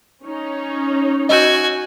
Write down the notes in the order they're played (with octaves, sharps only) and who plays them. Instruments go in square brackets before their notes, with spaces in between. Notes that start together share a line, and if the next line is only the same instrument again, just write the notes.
[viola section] C#4 D#4 C#5
[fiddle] F#4 G#5 [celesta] D#5 E6 G6